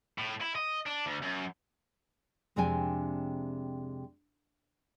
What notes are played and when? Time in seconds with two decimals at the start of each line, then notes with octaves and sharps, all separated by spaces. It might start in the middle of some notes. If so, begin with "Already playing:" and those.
0.18 A2
0.41 E4
0.55 D#5
0.86 D4
1.06 D2
1.23 F#2
2.56 F2 C3 G#3 D4 G5 G#5